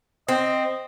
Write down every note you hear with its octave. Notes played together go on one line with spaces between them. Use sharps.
C4 D#5